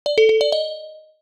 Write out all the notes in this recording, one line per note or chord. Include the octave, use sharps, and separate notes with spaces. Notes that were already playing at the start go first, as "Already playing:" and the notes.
D5
A4
A4
D5
D#5